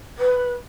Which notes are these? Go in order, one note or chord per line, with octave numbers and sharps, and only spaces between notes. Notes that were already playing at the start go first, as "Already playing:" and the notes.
B4